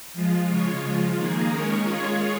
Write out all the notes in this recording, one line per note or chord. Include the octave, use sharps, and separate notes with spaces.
F3 G#3 F4
C#3 G#3 F4 C#5
F3 G#3 F4
D#3 A#3 D#4 G#4
D#3 G#3 C#4 A#4 C#5
G#3 F4 G#4 C#5